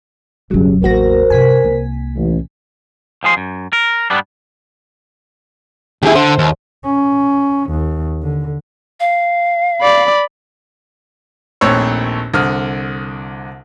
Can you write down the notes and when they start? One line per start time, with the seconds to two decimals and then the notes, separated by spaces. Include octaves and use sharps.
0.51 E1 F#2 C#3 F#3 G3 G4
0.83 A1 E2 A#3 F#4 A#4 C5 A#6
1.30 G2 C3 G#5 B6
1.64 C2 A#3
2.16 A1
3.23 D#2 F3 G#4 C6
3.37 F#2
3.73 A#4
4.10 G2 G3 B3 D4
6.02 D#2 E4 G4 G#4
6.15 D3 C5
6.38 D#2
6.85 C#4
7.71 D#2
8.23 D3
9.00 F5
9.82 D5 B5
11.61 A#1 D#2 A3 C4 C#5 E6
12.33 C2 D3 D#6 F6